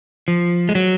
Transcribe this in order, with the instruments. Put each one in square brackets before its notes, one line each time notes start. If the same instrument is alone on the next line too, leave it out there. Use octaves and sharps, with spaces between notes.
[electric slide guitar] F3
G#3
F#3